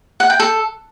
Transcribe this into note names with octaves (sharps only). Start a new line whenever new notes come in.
F#5
G5
A4